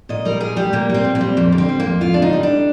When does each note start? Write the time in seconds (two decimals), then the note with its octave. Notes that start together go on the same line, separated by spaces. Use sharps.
0.09 A#2 D#5
0.25 G3 A#4
0.40 A#2 G#4
0.56 G3 G4
0.73 A#2 A#3
0.90 G3 C4
1.05 A#2
1.15 C4
1.21 G3
1.37 F2 A#3
1.52 D3
1.58 C4
1.69 G3
1.80 A#3
1.85 F2
2.01 F2 F4
2.14 D3 D4
2.22 D#4
2.33 G3
2.43 D4